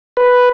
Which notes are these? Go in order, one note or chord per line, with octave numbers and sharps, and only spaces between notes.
B4